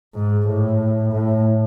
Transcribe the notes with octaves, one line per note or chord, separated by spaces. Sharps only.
G#2
A2
A2